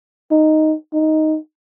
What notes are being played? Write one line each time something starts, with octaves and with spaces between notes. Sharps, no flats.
D#4
D#4